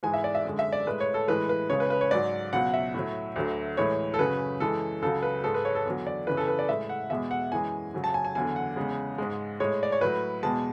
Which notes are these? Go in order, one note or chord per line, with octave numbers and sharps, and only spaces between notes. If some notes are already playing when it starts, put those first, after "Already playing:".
G#2 E3 G#3 G#5
E5
D5
E5
F#2 D3 G#3
E5
D5
A2 G#3 B4
C#5
A4
A2 E3 G#3 B4
B4
C#2 C#3 G#3 C#5
B4
B4
C#5
G#2 F#3 D5
C#2 B2 F#3 F#5
E5
A2 F#3
D2 D3 F#3
A2 E3 G#3 C#5
A4
F#2 C#3 F#3 B4
F#2 E3 G#3 A4
C#2 C#3 F#3 A4
B4
G#2 G#3 A4
B4
C#5
A4
E2 D3 F#3
D5
F#2 C#3 E3 B4
A4
B4
D5
A2 G#3 E5
F#5
E2 B2 G#3 E5
F#5
F#2 E3 G#3 G#5
F#2 C#3 F#3
A5
G#5
G#5
E2 D3 F#3 G#5
F#5
E2 C#3 G#3
G#2 G#3
A2 G#3 C#5
D5
C#5
A2 F#3 B4
E2 B2 G#3 A5